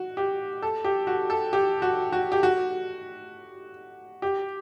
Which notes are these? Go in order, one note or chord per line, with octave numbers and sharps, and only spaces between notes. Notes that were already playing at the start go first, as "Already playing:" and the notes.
Already playing: F#4
G4
A4
G4
F#4
A4
G4
F#4
F#4
G4
F#4
G4